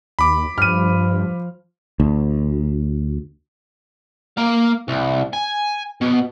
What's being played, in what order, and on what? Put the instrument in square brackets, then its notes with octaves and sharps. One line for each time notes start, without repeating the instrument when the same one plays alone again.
[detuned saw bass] D#2 [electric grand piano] B5 D6
[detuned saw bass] G2 [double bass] F3 [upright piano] F6 D#7
[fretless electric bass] D2
[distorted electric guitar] A#3 F5
C2
G#5
B2